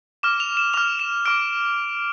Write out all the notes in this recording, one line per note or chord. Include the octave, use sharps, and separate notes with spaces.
D6 F6 E7
F7
E7
D6 F6 F7
E7
D6 F6 D7